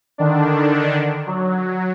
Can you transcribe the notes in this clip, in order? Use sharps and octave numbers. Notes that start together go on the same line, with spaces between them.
D3 D#3 D4
F#3